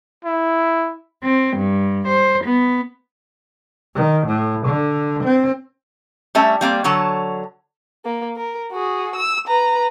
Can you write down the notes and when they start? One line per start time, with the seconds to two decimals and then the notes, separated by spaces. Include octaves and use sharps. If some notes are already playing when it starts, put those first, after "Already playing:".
0.25 E4
1.23 C4
1.57 G2
2.08 C5
2.44 B3
3.95 D#3
4.27 A2
4.66 D3
5.23 C4
6.35 G3 A3 C#4 E5
6.61 G3 A#3 C4 D5
6.84 D3 F#3 C#5 A5
8.05 A#3
8.37 A#4
8.71 F#4 G#4
9.16 E6
9.47 B4 A#5